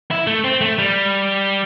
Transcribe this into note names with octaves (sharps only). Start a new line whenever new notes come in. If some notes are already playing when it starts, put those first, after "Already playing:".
E4
A3
C4
A3
G3